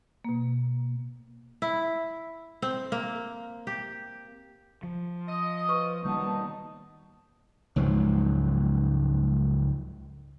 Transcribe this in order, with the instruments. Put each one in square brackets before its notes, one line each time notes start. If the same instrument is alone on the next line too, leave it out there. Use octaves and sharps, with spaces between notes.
[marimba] B2 A#3
[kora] E4
C4
A#3
G4
[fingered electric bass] F3
[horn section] D#5
[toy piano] B4 C#6
[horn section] B2 D#4 A5 [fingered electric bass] D#3 G3 A#3
[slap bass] C#2 G#2 F3 F#3